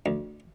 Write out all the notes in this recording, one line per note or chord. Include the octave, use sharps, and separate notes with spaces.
D2